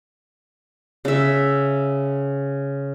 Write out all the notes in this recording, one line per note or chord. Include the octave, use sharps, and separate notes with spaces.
C#3 E5